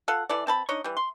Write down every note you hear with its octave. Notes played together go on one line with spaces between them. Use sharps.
F4 A4 F5 F#5
E3 E4 A4 D5
C4 A5 B5
D4 D#4 C#5 D#5
E3 G3
C6